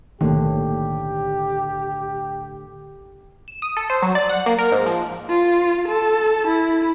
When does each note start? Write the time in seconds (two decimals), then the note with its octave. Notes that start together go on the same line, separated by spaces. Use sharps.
0.21 B1 A2 D3 D#3 A3 A#3 G4
3.48 E7
3.62 D#6
3.77 A4
3.90 C5
4.02 F#3
4.15 D5
4.29 F#5
4.46 A#3
4.59 A#4
4.72 G#2
4.86 F3
5.30 F4
5.88 A4
6.47 E4